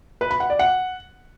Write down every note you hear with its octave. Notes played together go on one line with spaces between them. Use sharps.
B4
B5
F#5
D5
F#5